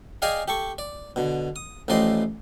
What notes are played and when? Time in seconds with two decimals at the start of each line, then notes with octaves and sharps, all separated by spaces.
0.22 G#4 D5 D#5 F5 G5 G#5
0.48 G4 A4 C#6
0.78 D5
1.16 B2 D3
1.56 D#6
1.88 A1 A2 F3 D5 D#5 C6